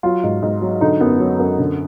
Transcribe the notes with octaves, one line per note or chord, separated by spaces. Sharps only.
F#3 F4
G#2
G#2
F#3
D3 D#4
F#2 B3
F#3
F#2
D3